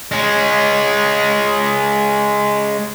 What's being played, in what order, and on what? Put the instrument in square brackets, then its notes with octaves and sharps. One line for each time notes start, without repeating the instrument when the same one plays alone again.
[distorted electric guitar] G#3 C#4